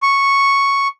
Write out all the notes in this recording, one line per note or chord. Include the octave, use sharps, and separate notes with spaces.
C#6